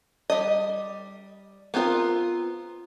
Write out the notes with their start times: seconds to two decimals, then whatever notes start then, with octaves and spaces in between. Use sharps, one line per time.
0.30 G3 D#5
1.74 B3 C4 F4 A4 A#4